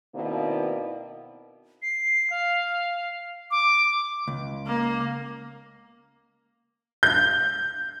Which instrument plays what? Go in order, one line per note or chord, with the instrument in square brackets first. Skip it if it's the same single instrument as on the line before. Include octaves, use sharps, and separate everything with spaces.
[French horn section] B2 D#3 A#3 C4 E4 D5
[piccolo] C7
F5
D6
[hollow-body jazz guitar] C#2
[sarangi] A#3
[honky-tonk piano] G6